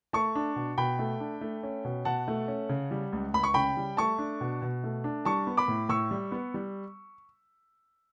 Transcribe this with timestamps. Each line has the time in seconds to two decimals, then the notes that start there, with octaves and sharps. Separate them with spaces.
0.13 A3 A5 C#6
0.35 D4
0.56 B2
0.78 B2 G5 B5
0.99 A3
1.20 D4
1.41 A3
1.63 C#4
1.85 B2
2.05 B2 F#5 A5
2.28 A3
2.48 C#4
2.69 C#3
2.91 G3
3.13 C#2
3.34 C#2 B5
3.44 C#6
3.54 C#3 G5 B5
3.77 G3
3.97 A3 A5 C#6
4.19 D4
4.41 B2
4.62 B2
4.84 A3
5.04 D4
5.25 G3 A5 C#6
5.47 B3
5.57 B5 D6
5.68 A2
5.89 A2 C#6 E6
6.11 G3
6.32 B3
6.54 G3